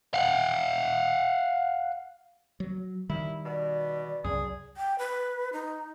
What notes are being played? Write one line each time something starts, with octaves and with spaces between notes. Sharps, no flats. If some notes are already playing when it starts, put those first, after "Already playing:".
F5 F#5
F#3
D#3 G3 E4
B2 D5
C2 F#2 G#4
G5
B4
D#4